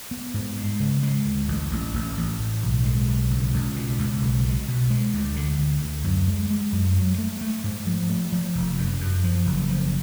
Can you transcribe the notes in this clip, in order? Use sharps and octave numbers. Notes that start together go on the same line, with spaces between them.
B3
G#2
G#3
C#3
G#3
D2
A1
A1
A1
A1
A2
B1
G#3
B1
C#2
C#2
B2
C#2
B1
B2
B2
G#3
D2
D3
D2
D2
F#2
G#3
G#3
F#2
F#3
A3
A3
G#2
F3
A3
F3
F1
F#2
F#2
F3
F#1
F3